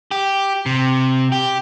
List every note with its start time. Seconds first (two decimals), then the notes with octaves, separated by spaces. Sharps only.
0.11 G4
0.66 C3
1.32 G4